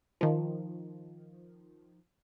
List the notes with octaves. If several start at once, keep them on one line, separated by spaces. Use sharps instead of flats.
D#3 F3